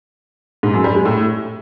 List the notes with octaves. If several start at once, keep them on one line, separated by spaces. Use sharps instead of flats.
G#2
F#2
G3
G#3
A2